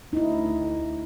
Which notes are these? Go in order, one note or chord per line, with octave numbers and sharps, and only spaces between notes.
D2 D#4 E4